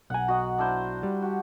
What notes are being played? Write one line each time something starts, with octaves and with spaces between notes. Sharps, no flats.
B1 F#5 G#5 A#5
F#4 D#5 F#5
D4 E4 C5
G3
F#4 G4